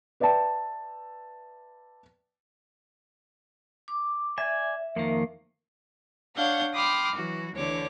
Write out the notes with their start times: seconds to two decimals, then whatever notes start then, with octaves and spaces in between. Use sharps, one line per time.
0.20 B4 D5 E5 G5 A5
3.88 D6
4.38 D5 E5 G#5
4.96 F2 D#3 A#3
6.36 D4 C#5 F5 F#5 G6
6.74 G5 B5 C6 D6 D#6 F6
7.15 E3 F#3 F#4
7.53 D2 D3 E3 C#5 D6